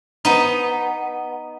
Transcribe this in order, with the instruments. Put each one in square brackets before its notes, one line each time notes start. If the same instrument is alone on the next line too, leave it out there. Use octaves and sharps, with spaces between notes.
[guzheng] B3 D#4